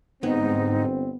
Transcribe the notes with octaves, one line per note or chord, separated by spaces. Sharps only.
G1 G#2 B3 C4 D#4